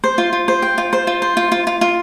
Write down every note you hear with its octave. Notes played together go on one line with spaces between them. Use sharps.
C5
F4
F4
C5
G5
F4
C5
F4
C5
F4
F4
F4
F4